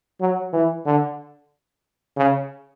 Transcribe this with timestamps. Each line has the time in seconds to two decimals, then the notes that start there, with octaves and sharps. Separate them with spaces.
0.20 F#3
0.53 E3
0.86 D3
2.17 C#3